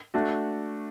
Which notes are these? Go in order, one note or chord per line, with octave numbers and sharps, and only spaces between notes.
A3 D4 F#4